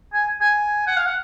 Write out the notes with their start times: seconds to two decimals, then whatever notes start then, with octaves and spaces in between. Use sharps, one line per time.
0.13 G#5
0.41 G#5
0.87 F#5
0.96 F5
1.06 F#5